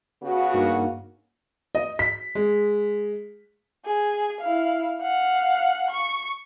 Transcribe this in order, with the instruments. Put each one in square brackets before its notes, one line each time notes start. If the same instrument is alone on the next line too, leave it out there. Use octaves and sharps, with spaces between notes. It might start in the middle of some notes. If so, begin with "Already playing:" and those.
[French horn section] C#3 B3 F#4
[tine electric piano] G2 A#3 D#4
[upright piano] D#5
B6
G#3
[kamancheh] G#4
E4 F5
F5 F#5
C#6